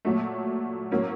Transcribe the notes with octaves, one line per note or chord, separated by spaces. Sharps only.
A#2 F#3 A3
A2 F#3 A#3 C#4